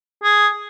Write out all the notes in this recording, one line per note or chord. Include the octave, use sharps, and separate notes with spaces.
G#4